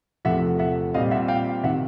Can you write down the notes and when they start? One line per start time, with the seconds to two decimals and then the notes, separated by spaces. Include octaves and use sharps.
0.25 E2 C3 F3 A3 E5 F#5
0.59 E5 F#5
0.94 A#2 G3 C4 D#5 F5
1.11 E5 F#5
1.28 F5 G5
1.64 C3 D#3 E5 F#5